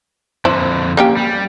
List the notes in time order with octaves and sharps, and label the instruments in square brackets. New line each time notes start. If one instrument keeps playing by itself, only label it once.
[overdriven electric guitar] F2 D3 [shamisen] E4 C5
[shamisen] A#3 C#4 G4
[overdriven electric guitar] G3